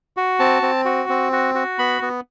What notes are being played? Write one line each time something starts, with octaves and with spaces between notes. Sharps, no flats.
F#4
C4 A5
C4
F#4
C4
F#4
F#4
B3 B5
B3